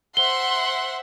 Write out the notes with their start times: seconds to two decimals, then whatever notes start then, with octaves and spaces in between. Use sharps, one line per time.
0.17 C5 E5 F#5 C6 G7